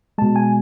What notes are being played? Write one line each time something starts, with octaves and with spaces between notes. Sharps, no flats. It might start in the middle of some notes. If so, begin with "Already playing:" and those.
B2 G#3 A5
G#5